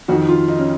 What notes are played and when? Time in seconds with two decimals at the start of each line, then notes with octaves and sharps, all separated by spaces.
0.08 F2 D#3 F#4
0.29 F4
0.48 D#4
0.59 C#4